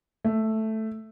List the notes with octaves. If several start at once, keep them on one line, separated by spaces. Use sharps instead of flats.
A3